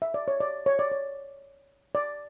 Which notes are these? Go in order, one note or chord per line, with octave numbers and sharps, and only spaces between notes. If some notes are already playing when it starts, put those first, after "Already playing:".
E5
D5
C#5
D5
C#5
D5
C#5
D5